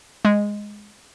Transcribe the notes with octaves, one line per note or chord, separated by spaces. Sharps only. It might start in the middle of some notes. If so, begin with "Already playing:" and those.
G#3